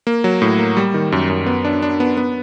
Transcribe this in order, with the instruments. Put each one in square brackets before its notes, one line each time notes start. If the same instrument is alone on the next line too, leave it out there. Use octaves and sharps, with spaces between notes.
[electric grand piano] A#3
F#3
A2
A#3
G3
D#3
F#2
F#2
B3
D4
D4
B3
B3